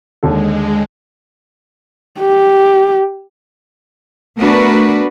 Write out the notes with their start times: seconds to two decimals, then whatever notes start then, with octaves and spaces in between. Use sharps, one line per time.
0.23 D#2 D3 G#3 A4
2.20 G4
4.38 A3 B3 D4 F#4 A#4 B4